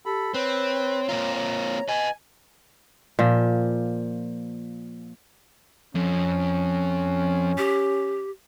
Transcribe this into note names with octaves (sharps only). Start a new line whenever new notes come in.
G4 A4 B5
C4 B4 C#5
A#3 C4 F4 A#5
C#5
B4 D#5 G#5
A#2 F3
F2 C#4
G4